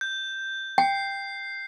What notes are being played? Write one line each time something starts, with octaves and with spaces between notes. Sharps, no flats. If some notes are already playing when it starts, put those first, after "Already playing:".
G6
G5 C7